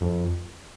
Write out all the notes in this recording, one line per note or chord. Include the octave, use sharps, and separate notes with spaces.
F2